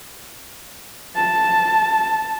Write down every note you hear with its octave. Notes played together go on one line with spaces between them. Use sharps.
A5